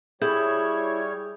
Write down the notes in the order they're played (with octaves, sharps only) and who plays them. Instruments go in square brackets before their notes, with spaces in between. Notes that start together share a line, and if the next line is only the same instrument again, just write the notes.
[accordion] G3 C#5 [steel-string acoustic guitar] E4 [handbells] G#4 G6